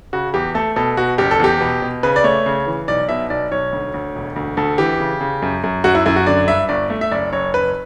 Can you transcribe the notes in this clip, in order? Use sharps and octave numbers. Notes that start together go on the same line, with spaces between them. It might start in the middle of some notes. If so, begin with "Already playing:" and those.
C#3 F#4
E2 G4
A3 A4
B2 A4
B2 F#4
F#1 G4
A4
E2 G4
B2
B2
C#3 B4
D5
A3 C#5
C#3
E3
B1 D5
B2 E5
B1 D5
B1 C#5
D2
D2
E1
D2
D2 A4
E3 G4
C#3
C#3
F#2
F#2
F#2 F#4
E4
F#2 E4
F#4
D3 D5
G2 E5
G1 D5
A3
E5
F#1 D5
F#1 C#5
F#1 B4